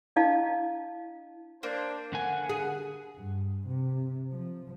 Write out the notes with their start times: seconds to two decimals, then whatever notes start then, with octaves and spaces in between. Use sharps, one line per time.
0.16 D4 E4 D#5 F5 A5
1.63 A#3 D4 C5
2.13 D3 F#5 G#5
2.49 G#4
3.16 G2
3.67 C3
4.32 F3